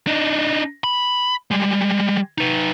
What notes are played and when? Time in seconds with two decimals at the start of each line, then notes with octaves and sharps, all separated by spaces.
0.07 D4 D#4
0.84 B5
1.51 G3 G#3
2.38 D#4 B4